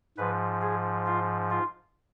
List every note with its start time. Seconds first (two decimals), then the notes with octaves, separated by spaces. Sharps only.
0.17 G#2 F3 B4
0.62 G#4
1.06 F4
1.50 F4